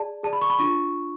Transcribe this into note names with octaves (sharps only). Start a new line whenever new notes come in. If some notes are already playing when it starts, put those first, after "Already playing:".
Already playing: G#4 D5 A5
G#4 D5 A5
B5
C#6
B5
D4 F4 C#6